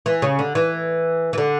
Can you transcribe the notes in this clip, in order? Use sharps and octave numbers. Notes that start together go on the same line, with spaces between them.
E3
C#3
D3
E3
E3
D3